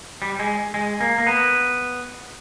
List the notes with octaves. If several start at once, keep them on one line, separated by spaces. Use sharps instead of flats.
G3
G#3
G#3
A#3
A#3
B3